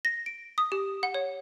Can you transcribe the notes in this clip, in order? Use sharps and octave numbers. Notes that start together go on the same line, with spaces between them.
A#6
D7
D#6
G4
F#5
C#5